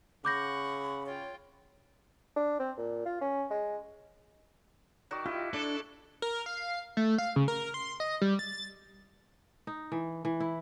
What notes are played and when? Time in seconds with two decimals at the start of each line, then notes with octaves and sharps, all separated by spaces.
0.25 C#3 F#5 B5 C#6 D6 G6 A#6
1.06 F4 C#5 G5
2.36 D4
2.59 C4
2.78 A#2
3.05 F4
3.21 C#4
3.50 G#3
5.11 D#3 F#4 D5
5.26 E4 F4 G4 D#5
5.54 D4 A4 D5
6.22 A#4
6.46 F5
6.97 A3
7.18 F5
7.36 C#3
7.48 A#4
7.74 C6
8.00 D#5
8.21 G3
8.39 A6
9.67 D#4
9.92 E3
10.25 E3
10.40 E4